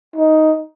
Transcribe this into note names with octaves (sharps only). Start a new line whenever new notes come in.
D#4